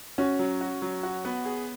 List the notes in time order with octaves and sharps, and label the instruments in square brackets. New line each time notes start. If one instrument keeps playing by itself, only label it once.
[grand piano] C#4 [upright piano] F#4
[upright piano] F#3
F#4
F#3
F#4
B3
G#4